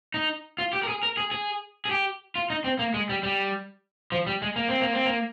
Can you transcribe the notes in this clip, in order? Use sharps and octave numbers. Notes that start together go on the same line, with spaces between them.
D#4
F4
G4
A#4
G#4
A#4
G#4
G#4
G#4
G4
F4
D#4
C4
A#3
G#3
G3
G3
F3
G3
G#3
A#3
C4
A#3
C4
A#3